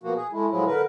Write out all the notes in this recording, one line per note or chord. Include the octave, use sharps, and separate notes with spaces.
B2 F3 A#3 F#4
G#4
G#3 A3 E4
A2 F3 F#3 G#3 E4
D3 A#4 B4